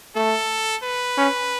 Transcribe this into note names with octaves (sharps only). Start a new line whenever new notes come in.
A3 A4
B4
C#4